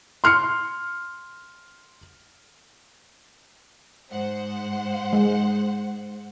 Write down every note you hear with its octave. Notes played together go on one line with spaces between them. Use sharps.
C6 F6 C7 C#7
G#2 C5 F#5
G#3